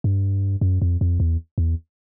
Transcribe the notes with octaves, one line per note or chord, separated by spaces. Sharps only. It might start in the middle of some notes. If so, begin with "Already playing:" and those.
G2
F#2
F2
F2
E2
E2